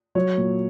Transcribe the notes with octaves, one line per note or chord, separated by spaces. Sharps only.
F#3 C#5
A#2